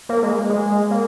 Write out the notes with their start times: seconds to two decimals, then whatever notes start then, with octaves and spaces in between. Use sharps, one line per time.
0.09 A#3
0.22 G#3
0.49 G#3
0.91 A#3